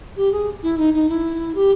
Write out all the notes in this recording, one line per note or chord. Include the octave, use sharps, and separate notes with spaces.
G4
G#4
E4
D#4
D#4
E4
G4